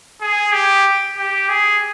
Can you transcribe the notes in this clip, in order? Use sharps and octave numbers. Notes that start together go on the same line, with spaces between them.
G#4
G4
G4
G#4